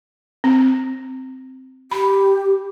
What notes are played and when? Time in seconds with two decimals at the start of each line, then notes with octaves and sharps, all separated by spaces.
0.44 C4
1.92 G4 B5